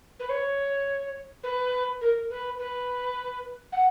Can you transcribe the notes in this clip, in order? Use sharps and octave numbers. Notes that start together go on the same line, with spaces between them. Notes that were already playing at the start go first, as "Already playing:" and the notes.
B4
C#5
B4
A#4
B4
B4
F#5